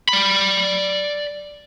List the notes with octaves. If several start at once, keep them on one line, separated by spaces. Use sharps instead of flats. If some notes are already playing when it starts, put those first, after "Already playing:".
D5 B5